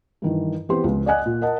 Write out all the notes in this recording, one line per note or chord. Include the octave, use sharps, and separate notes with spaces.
G2 D#3 E3
E3 B3 C4 G4 C6
C#2 F3
D5 D#5 F#5 G#5 F#6
A#2
A#4 D#5 F#5 A5